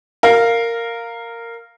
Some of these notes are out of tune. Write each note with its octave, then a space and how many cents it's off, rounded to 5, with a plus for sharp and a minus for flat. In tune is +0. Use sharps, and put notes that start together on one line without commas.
A#4 -10 F5 +0